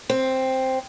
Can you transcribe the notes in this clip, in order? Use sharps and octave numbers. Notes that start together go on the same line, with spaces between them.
C4